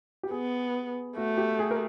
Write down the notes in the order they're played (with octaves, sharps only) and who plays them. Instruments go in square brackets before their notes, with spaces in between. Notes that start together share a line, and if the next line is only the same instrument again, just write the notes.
[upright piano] G4
[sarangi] B3 [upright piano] G#4
[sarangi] A3 [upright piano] F#4
[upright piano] G4
G#4
A#4